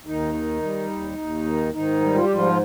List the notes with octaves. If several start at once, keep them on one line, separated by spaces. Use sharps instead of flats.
D#2 D#3 D#4
D#3
G3
D#2
D#2
D#3
G#2 D#3 D#4
G3
F4
G4
G#2 F3 F4